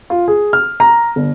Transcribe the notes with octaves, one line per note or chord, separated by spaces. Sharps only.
F4
G#4
F6
A#5
G1